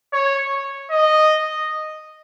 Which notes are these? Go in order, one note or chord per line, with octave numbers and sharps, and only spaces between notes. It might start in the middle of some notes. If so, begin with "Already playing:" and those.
C#5
D#5